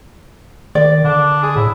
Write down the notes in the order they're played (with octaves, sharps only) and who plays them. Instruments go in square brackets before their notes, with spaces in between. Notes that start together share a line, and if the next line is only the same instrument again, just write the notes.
[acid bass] D#3 [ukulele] D5
[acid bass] D3 [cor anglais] D4
[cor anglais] G#4
[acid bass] A2 [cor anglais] E4